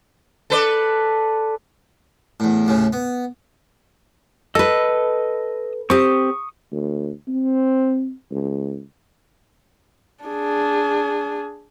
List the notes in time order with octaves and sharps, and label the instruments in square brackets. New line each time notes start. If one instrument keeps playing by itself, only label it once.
[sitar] A4 B4 D5
[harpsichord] E2 A2
D#2 A2 C#3
B3
[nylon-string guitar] A4 B4 [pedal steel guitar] D#5 E6
[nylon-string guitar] C4 G4 [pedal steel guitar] C#6 D#6
[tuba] D2
C4
C#2
[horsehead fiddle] D4 G#4